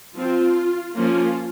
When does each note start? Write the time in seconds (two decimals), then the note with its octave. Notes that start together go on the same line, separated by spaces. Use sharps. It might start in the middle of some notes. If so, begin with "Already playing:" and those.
0.15 F3 C4 F4
0.95 F3 A#3 C#4 F4